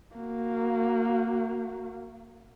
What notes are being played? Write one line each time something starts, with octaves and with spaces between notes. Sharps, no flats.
A#3 F#4